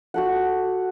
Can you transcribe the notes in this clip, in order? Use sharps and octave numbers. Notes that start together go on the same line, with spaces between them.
F#4 A4 F#5